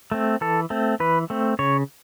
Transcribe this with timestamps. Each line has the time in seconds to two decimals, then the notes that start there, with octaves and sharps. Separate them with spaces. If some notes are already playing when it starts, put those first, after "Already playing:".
0.12 A3 C4
0.41 E3 A4
0.70 A3 C4
1.00 E3 B4
1.30 A3 C4
1.59 C#3 C#5